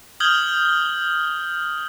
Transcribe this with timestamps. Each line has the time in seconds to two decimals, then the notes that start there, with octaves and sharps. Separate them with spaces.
0.20 D#6 F6 G6 G#6 F#7 G7